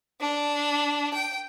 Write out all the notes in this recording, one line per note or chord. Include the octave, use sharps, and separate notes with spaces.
D4
G5